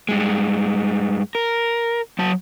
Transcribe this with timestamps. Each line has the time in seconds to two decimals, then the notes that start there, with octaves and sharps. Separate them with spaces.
0.09 G2 G#3
1.35 A#4
2.19 F#3 A5